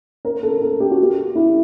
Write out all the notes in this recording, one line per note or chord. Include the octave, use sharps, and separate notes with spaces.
A#4
A4
A4
G4
F#4
G4
E4